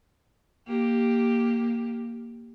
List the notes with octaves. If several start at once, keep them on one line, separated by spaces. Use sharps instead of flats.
A#3 G4